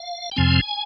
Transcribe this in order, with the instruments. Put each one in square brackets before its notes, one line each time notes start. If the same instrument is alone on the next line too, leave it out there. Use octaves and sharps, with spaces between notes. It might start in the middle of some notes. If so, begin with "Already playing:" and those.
Already playing: [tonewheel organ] F5
G5
F2 C3 F3 C4 G#5